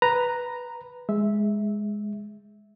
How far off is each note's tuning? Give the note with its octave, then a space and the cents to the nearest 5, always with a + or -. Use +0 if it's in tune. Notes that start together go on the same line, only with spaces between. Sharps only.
B4 +0 A#5 +0
G#3 +0 E5 -10